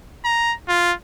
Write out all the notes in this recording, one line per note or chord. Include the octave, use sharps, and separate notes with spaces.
A#5
F4